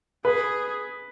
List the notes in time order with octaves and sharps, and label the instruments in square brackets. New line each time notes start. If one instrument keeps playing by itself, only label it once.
[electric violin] G#4 [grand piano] B4